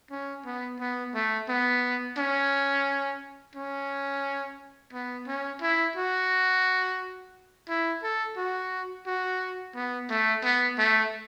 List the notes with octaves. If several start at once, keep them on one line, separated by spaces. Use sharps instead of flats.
C#4
B3
B3
A3
B3
C#4
C#4
B3
C#4
E4
F#4
E4
A4
F#4
F#4
B3
A3
B3
A3